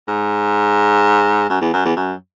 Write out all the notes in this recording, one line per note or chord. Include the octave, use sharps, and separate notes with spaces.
G#2
F#2
E2
F#2
E2
F#2